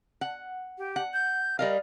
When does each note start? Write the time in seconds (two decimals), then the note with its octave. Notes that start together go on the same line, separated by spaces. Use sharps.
0.21 F#5
0.78 G4
0.96 F#5
1.13 G6
1.59 G3 A#4 D#5 F5